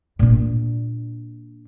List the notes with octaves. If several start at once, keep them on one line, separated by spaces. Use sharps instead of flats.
A#2 D4